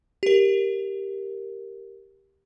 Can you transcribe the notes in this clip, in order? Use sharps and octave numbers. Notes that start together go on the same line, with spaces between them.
G4 A#4